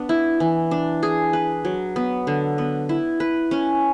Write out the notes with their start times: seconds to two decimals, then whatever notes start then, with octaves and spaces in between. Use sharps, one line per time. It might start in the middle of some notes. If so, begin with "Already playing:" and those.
Already playing: B3 D4
0.09 E4
0.40 E3
0.71 D4
1.03 G#4
1.33 B4
1.65 F#3
1.96 B3
2.27 D3
2.58 B3
2.89 E4
3.20 B4
3.51 C#4